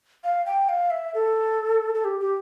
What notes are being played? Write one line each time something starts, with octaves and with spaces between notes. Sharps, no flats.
F5
G5
F5
E5
A4
A4
G4
G4